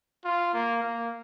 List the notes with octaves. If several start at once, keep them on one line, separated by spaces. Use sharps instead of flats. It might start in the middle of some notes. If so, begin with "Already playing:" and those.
F4
A#3
A#3